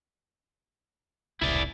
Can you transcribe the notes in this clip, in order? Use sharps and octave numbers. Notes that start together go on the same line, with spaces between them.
E1 C2 E4 D5